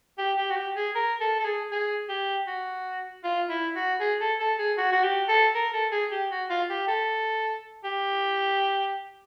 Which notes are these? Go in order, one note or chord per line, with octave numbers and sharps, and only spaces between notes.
G4
G4
F#4
G4
G#4
A#4
A4
A4
G#4
G#4
G4
F#4
F4
E4
F#4
G#4
A4
A4
G#4
F#4
F#4
G4
A4
A#4
A4
G#4
G4
F#4
F4
G4
A4
G4